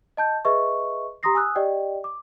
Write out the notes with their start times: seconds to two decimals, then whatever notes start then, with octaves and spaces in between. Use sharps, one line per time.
0.17 D#5 A5 G6
0.45 G#4 B4 D#5 E5 C#6
1.23 G4 A#5 C6 D#6 A#6 C7
1.35 G#5 D#6 E6 F#6
1.56 G4 D5 D#5 G5
2.04 D6